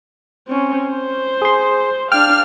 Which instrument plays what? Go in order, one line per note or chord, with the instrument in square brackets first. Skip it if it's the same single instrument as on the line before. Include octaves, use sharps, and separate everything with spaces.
[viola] C4 C#4
C5
[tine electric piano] G#4 C6
[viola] D4 F5 [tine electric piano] G5 [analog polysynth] F6